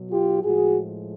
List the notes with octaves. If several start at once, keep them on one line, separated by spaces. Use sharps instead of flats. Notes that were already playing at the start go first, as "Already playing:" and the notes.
Already playing: B2 F#3
F4 G4
A2 F3 G#3 F#4 G#4